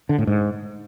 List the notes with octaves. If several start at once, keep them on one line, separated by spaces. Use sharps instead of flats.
D3
A2
G#2